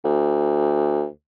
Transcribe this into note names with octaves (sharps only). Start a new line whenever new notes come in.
D2